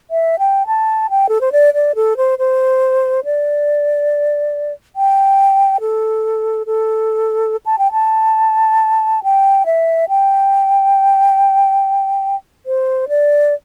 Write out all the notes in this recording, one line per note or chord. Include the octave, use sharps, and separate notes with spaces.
E5
G5
A5
G5
A4
C5
D5
D5
A4
C5
C5
D5
G5
A4
A4
A5
G5
A5
G5
E5
G5
C5
D5